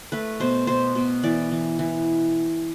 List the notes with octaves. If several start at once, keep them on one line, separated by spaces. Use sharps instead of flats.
A3 B4
B2 C5
B2 C5
B2
E3 D5
E3
E3